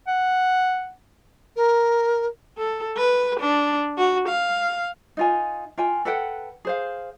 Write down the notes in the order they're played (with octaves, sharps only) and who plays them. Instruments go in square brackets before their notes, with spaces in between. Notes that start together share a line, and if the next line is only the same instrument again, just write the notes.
[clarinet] F#5
[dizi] A#4
[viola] A4
B4
D4
F#4
F5
[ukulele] D#4 F4 G#5
F4 G5 G#5
A4 B4 F#5 G5
G#4 C5 F5